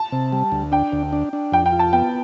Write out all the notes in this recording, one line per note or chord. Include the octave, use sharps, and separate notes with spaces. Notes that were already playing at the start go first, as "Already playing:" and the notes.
Already playing: A5
C3
G3
D2
D4 G5
D2
D4
D4
F2 G5
G5
F4
A5
B3 G5